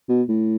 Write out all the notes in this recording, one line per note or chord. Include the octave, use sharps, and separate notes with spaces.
B2
A2